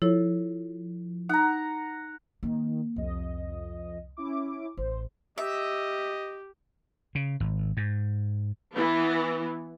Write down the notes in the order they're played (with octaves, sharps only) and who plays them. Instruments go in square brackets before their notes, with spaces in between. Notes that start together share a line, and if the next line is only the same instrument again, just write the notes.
[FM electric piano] F3 [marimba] E4 A4 C#5
[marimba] D#4 [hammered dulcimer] F#5 A#5
[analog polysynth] D#3 [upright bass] A#3 C4
[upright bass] C2 [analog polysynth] F2 D#5
[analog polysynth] C#4 E4 D6
[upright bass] A1 [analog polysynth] C5
[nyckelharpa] G4 [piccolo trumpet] D#5 [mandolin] E5
[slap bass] C#3
G#1
G#2
[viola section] E3 B3